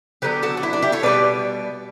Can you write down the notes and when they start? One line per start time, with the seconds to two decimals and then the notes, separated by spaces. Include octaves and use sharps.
0.22 D3 F#3 B3 D4 G4 B4
0.43 F#4 A4
0.57 D4
0.63 E4
0.73 D4
0.82 E4 G4
0.92 A4 C#5
1.03 B2 G3 D4 B4 D5